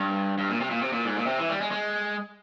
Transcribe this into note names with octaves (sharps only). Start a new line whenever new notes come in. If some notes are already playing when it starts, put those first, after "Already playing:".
Already playing: G2
G2
A#2
C3
A#2
C3
A#2
G#2
A#2
C3
E3
G3
G#3
G#3